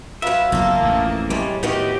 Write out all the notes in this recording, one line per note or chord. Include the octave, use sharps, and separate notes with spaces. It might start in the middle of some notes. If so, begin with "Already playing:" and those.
F#3 F4 B4 E5
F#1 B1 A#3 F4 A4
A1 F2 B2
D#2 A2 G3 G#3
A2 D#3 F#3 B3 D#4 G4